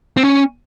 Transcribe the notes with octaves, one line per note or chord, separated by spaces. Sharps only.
C4
C#4